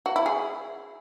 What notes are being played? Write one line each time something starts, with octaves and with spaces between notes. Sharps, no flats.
F#4
E4
G#4